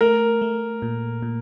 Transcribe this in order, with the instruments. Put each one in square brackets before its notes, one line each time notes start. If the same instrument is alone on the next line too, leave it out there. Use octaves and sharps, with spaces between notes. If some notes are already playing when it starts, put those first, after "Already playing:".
[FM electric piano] A3 [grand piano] A#4
[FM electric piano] A3
A#2
A#2